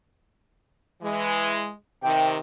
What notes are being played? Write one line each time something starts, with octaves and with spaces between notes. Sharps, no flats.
E3 G#3
C3 D#3 G5